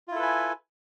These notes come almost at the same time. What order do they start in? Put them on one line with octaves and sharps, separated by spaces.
F4 E4 A4 B4 G#5